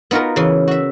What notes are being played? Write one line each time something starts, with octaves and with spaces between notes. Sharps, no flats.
B3 D#4 F4 F#4 A#4
C#3 E3
F#4 E5